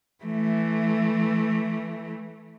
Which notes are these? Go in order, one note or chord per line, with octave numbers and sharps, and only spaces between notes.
E3 A3